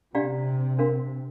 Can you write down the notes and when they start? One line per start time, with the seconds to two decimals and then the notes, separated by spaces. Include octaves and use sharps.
0.15 C3 D4 G4 D5 F5 A#5
0.78 D4 A#4 F5 C6